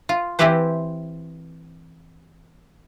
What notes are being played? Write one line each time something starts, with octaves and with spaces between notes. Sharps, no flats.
F4
E3 C4 E4 G4 B4 C5